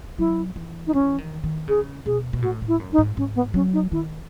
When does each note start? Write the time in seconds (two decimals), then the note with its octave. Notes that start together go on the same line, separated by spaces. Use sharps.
0.18 F#3 E4
0.56 E3
0.87 D#4
0.93 E3 C#4
1.18 D#3
1.44 D#3
1.68 C#3 G#4
2.06 B2 G#4
2.33 B2
2.42 A2 F#4
2.62 A2
2.68 E4
2.80 F#2
2.93 D#4
2.98 G#2
3.17 G#2 C#4
3.36 B3
3.54 F#3 C#4
3.73 D#4
3.92 D#3 E4